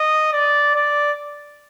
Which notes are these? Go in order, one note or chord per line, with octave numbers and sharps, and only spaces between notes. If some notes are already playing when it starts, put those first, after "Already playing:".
Already playing: D#5
D5
D5